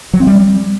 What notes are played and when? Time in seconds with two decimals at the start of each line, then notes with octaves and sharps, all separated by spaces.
0.13 F#3
0.20 C4
0.27 G3